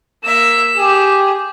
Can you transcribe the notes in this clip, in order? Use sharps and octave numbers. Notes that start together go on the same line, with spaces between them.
A#3 E5 E7
G4 G#4